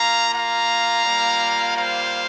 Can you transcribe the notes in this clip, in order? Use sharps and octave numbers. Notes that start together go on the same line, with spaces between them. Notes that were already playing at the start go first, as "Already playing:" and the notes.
Already playing: A#3 F4 F5 A#5
F5 A#5
G3 A#3 F4
C5 F5